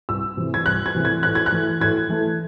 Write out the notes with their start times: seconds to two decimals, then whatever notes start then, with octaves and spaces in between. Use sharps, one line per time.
0.09 C2 E6
0.37 C3 E3 A3
0.54 G#6
0.66 C2 F#6
0.86 G#6
0.95 C3 E3 A3
1.05 G#6
1.23 A2 F#6
1.35 G#6
1.46 F#6
1.52 E3 A3
1.80 A2 G#6
2.09 E3 A3